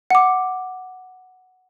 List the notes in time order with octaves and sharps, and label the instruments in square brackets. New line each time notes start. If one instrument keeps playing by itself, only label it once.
[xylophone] F#5 D6